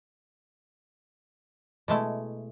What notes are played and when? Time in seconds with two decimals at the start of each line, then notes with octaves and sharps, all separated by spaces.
1.88 B2 G#3 A3 E4